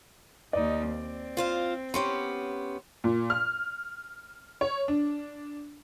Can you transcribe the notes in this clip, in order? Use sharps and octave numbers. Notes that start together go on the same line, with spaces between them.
D#2 D#4 D5
C4
F4 C5 F5
B3 C#4 G4 C6
A#2
F6
C#5
D4